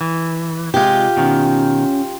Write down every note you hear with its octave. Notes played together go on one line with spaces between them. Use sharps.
E3
C3 G#3 F4 G4
B2 D#3 C#4